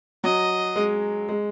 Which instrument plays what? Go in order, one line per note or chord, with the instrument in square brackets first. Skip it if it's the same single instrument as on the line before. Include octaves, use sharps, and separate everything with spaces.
[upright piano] F#3 [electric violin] D#5
[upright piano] G#3
G#3